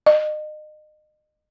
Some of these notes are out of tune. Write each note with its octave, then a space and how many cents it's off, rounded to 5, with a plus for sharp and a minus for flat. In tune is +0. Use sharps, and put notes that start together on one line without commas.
D#5 -35